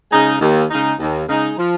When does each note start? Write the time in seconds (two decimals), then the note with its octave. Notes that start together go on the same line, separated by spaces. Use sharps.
0.11 C#3 G#3 D#4
0.41 D#2
0.70 C#3 G#3 D#4
1.00 D#2
1.28 C#3 G#3 D#4
1.57 F3